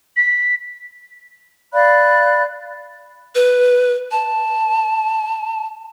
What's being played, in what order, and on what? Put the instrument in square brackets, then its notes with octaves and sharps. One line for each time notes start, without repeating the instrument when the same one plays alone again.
[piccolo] B6
[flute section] D5 F5 B5 F#6
[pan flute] B4
A5